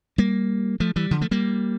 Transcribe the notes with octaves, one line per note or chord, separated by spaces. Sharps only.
G3 A#3
F3 A3
E3 G3
D3 F3
F3 A3
G3 A#3